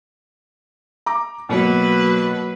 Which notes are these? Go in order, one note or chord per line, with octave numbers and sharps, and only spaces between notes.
A#5 D6
B2 F#3 A#3 B4